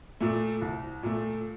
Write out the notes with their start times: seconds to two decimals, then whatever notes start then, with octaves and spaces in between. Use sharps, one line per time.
0.21 A#2 A3
0.62 C2
1.03 A#2 A3